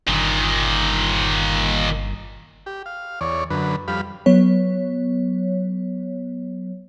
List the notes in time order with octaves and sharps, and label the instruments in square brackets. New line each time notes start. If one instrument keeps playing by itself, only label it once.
[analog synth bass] G1 [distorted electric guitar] A#2 D#3
[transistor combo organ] G4
F5
E2 C#5 D5
F#2 D3 B4
F2 G3 F5 B5
[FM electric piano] F#3 B3 C#5